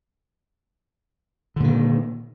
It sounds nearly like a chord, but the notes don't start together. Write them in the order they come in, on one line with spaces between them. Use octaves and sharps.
D3 A#2 D#3